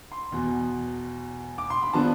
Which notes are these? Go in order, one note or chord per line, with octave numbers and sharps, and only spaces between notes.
C6
E2 B2 B3
D6
C6
B5
D3 F3 B3 D4 A5